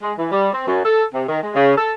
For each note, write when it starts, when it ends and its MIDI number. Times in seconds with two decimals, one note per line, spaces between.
0.02 0.13 56
0.17 0.30 52
0.31 0.48 55
0.52 0.66 60
0.67 0.82 42
0.84 1.04 69
1.13 1.22 48
1.27 1.41 51
1.42 1.53 56
1.55 1.73 49
1.77 1.91 69